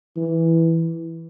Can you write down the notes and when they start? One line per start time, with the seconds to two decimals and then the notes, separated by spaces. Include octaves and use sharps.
0.17 E3